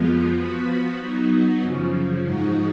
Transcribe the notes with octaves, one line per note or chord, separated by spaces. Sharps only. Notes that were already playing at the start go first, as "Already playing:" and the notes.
Already playing: F2 F3 G#3 B3 F4
F3 B3 F#4 B4
F#3 B3 D#4 F#4
F#2 C#3 F3
G#2 F3 G#3 D#4 F#4